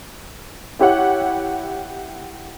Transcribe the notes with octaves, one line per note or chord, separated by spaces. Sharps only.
E4 G4 C#5 F#5